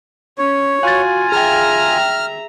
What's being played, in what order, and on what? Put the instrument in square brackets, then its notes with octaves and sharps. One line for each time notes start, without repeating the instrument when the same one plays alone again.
[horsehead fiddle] C#4 [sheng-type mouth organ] C#5
[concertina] F4 G#5 [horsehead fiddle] F#4 [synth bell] F5 A6
[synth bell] G#4 G5 [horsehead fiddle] E5 A#5 [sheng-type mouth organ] F6